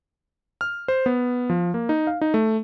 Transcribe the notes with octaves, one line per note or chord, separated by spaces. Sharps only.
F6
C5
B3
F3
A#3
D#4
F5
D#4
A3